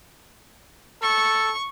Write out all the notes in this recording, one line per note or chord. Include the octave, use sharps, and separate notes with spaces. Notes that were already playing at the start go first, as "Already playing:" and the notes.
A4 C#6